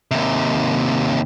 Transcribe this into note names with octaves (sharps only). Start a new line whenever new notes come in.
D#2 C3